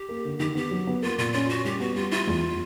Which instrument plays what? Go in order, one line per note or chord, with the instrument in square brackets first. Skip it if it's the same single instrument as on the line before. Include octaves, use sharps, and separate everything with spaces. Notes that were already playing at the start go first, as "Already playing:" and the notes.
Already playing: [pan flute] G4
[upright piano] A#3
D3
[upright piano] D#3 [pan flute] G4
[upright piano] B3 [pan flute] G4
[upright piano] F#3
B3
[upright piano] A#3 [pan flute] F4
[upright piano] A#2 [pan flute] F4
[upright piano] C#4 [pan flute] F4
[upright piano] C#4 [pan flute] F#4
[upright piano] G3 [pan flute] G4
[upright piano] B3 [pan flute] F#4
[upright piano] G3 [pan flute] F4
[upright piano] E4 [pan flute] F4
[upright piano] E2